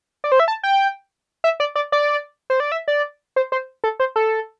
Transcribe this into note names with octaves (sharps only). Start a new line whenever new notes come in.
D5
C5
E5
A5
G5
E5
D5
D5
D5
C5
D5
E5
D5
C5
C5
A4
C5
A4